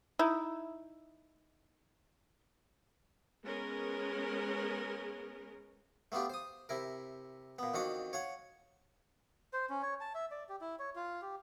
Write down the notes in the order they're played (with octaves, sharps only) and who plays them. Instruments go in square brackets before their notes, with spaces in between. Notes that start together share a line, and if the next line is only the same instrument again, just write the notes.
[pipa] D#4 E4
[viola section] G#3 B3 C#4 G#4 A#4
[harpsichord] A3 B3 D4 F4 G4
C5 D#6
C3 E4 A#4
A#2 B3
F2 D#3 D4 F#4 F#5
C#5 F5 F#5
[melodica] C5
C#4
C#5
A5
E5
D5
G4
E4
C#5
F4
G4